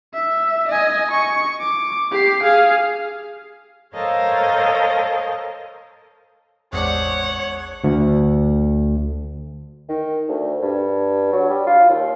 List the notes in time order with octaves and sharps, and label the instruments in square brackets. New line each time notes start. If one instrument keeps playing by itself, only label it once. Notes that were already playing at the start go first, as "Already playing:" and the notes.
[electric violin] E5
D#5 G#5
C#6
D6
G4 C7
G#4 F5
[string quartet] A4 A#4 C5 C#5 D#5 F5
[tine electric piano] A1 E2 [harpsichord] G#3 C4 D4 [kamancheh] C#5 [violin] F#5
[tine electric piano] D2
[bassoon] D#3
D2
G2
F#3
G3
F4
D#2